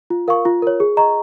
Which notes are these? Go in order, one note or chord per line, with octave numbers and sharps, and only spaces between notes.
F4
A#4 F5 C#6
F4
A#4 C#5
G#4
D#5 A#5 C#6